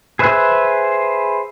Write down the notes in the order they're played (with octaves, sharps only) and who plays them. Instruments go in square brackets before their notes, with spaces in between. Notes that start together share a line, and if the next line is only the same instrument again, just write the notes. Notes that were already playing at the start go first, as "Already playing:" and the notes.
[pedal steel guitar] G#4 B4 C5 E5 F#6